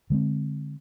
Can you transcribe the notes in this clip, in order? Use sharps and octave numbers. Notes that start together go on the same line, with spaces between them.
D3 G#3 C4